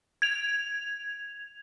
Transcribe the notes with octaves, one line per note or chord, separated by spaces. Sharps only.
G#6 F7